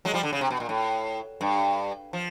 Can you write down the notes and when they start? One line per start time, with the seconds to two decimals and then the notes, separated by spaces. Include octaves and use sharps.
0.05 F#3 G#3
0.14 F3 G3
0.23 D3
0.33 C#3
0.41 C3
0.50 B2
0.60 A#2
0.69 A2
1.41 G2
2.13 F3